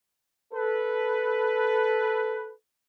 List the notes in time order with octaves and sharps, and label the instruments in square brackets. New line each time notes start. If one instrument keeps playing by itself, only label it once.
[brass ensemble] A4 B4